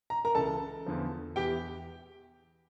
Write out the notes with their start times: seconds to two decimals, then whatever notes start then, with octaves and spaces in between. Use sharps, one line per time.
0.10 A#5
0.25 A#4 A#5
0.35 C#2 C#3 E3 A4 A5
0.86 E2 D3 F3
1.36 E2 E3 G4 G5